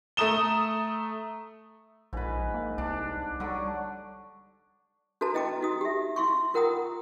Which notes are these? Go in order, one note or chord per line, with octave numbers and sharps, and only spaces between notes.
A3 A#5 D#6 E7 G7
A#1 G#2 B4
A#3
C2 D4
D3 F#3 G3
D4 F#4 A4 B4 A5 A#5
E4 D#5 G5 A#5 D6
D#4 F#4 D#6
G4 E5
E4 F5 C6 C#6
F4 A#4 F#5 G5 A#5 D#6